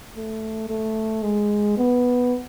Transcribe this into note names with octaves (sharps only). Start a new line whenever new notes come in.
A3
A3
G#3
B3